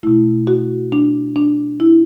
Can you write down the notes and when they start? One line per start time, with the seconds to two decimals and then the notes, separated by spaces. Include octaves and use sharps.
0.03 B2 A3 E4
0.47 F#4
0.92 D4
1.36 D4
1.80 E4